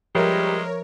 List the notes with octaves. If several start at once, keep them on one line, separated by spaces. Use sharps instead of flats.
F3 G3 G#3 A#4 B4 C#5 E5